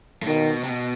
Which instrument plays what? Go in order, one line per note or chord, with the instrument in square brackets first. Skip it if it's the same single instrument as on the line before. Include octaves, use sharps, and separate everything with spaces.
[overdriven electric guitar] A2
[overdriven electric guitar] B2 [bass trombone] D#3
[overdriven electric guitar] C3
B2